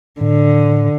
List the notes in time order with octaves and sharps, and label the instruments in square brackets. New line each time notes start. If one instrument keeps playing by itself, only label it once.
[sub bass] A2 [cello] D3